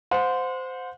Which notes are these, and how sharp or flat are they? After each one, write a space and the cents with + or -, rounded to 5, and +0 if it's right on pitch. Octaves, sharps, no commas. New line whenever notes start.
C5 -15 F#5 -40